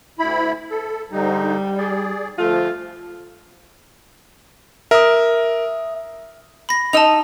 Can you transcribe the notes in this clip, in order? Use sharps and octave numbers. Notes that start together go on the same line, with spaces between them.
D2 E4 B5
A4
G#2 D3 G3 D#4
G#4 D5
D2 F3 A3 F4
A#4 E5 D#6
B5 A#6
D#4 D#5 A5 E6 F7